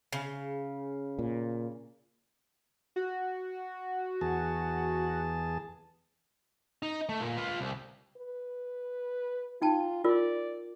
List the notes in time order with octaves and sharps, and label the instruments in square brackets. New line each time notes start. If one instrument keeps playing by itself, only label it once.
[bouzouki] C#3
[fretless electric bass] A#2
[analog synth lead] F#4
[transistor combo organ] E2 G#4 A5
[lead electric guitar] D#4
A3
A#2
F4 B4
C2
[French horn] B4
[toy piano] D#4 G5 A5 [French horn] F4
[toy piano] F4 A#4 [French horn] D5